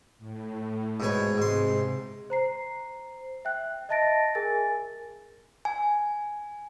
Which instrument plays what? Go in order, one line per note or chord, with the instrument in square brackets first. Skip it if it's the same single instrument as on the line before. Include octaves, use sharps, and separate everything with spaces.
[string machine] A2
[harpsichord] G#2 B2 C#5
[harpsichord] G#2 C6 [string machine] C3
[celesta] C5 A#5 C7
E5 G5 F#6
D#5 E5 A5 A6 A#6 D7
G#4 A#4 G#5 A6
[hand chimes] G#5